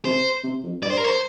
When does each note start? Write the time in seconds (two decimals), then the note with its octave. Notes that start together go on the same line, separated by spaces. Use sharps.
0.05 C3 C5
0.44 C3
0.63 F2
0.82 G2 D5
0.90 C5
0.97 A#4
1.04 C5